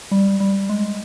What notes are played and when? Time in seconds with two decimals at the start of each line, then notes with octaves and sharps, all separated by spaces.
0.12 G3
0.40 G3
0.69 G#3